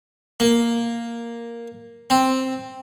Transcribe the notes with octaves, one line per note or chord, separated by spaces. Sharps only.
A#3
C4